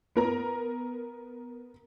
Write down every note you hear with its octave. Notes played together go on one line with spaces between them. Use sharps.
B3 A#4 A#5